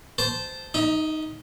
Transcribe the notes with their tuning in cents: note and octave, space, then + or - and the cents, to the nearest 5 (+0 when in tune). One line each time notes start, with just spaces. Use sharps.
C5 -10 A5 -10
D#4 +0 E5 -45